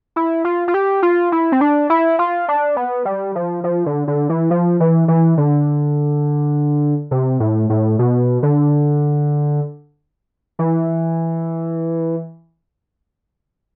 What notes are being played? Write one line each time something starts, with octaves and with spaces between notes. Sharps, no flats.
E4
F4
F4
G4
F4
E4
C4
D4
E4
F4
D4
B3
G3
F3
F3
D3
D3
E3
F3
E3
E3
D3
C3
A2
A2
B2
D3
E3